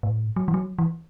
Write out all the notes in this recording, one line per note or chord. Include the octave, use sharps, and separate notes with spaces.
A2
F#3
E3
F#3
E3